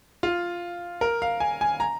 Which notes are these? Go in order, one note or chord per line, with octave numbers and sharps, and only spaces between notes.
F4
A#4
F5
G#5
G#5
A#5